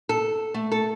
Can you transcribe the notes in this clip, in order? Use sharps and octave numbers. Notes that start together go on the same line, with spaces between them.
A4
A3
A4